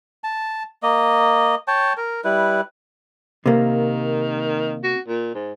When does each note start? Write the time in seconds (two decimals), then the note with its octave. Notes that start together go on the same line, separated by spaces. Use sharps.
0.24 A5
0.83 A#3 D#5
1.68 C#5 G5 A5
1.97 A#4
2.24 G3 E4 B4
3.46 C3 D#3 A#3
4.84 F#4
5.08 A#2
5.34 G#2